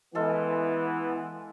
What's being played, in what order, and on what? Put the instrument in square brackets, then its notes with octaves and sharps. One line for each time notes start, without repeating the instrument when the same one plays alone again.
[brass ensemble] E3 B3 [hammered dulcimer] G#3 A4 F5